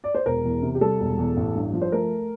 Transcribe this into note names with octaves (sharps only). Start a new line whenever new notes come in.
D5
C5
E1 A#4
E2
C3
G4
G3 A4
E1
E2
A1
G2
F3
C5
A3 A#4